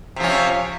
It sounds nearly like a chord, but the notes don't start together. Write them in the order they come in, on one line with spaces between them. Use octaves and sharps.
C3 F3 C#4